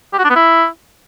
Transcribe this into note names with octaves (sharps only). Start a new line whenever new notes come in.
G4
F#4
D4
B3
E4